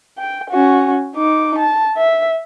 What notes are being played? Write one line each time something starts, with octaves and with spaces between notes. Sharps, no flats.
G5
C#4 F#4
D#4 D6
A5
E5